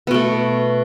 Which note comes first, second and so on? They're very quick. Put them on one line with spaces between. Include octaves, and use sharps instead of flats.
B3 B2 A3